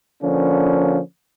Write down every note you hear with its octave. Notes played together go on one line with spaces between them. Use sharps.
D3 F3 A#3 C#4